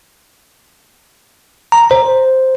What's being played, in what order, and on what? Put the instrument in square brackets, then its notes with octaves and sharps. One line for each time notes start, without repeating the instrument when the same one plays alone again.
[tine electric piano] A#5
C5